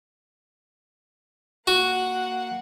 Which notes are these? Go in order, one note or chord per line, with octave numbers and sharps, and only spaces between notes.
A#3 F#4 F#5